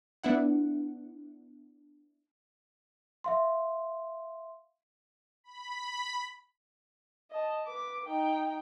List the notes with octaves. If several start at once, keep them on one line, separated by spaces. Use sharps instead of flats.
B3 D4 E4 F#5
E5 F5 C6
B5
D#5 A5
B4 D6
D#4 G5